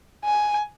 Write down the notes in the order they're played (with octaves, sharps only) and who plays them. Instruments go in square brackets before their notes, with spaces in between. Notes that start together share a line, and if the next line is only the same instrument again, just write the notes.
[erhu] G#5